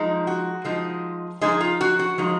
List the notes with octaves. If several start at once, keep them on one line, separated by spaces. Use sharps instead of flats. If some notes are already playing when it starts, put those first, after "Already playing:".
Already playing: F3 G#3 D#4
F#4
F3 G#3 D#4
F3 G#3 D#4 G#4
F4
F#4
F#4
F3 G#3 D#4